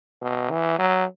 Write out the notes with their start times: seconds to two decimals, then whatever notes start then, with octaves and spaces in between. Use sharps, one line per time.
0.22 B2
0.50 E3
0.79 F#3